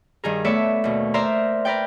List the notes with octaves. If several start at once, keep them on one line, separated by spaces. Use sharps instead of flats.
G2 D#3 G#4 A#4
A3 B3 A4 C#5 D5 E5
D#2 B2
A#4 C5 D5 E5 A#5 C6
A#4 B4 D5 G5